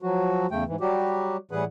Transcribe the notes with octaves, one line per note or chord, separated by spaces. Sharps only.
F3 F#3 F#4
E2 C#3 A3 G5
G#2 E3
F#3 G3 F#4 G4
A2 E3 G3 G#4 B4 F#5